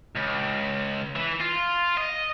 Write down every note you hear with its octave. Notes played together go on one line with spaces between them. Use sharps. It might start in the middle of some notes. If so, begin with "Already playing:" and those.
C#2
E3
F4
D#5